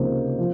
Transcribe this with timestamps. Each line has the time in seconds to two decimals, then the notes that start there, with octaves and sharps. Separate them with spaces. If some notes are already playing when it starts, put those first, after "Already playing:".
Already playing: C#2 C3 F3 A#3 D#4 C5
0.38 F3